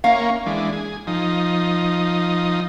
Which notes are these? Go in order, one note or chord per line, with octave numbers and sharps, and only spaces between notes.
A#3 C#4 F5
E3 G#3 D4
G#4
F3 D#4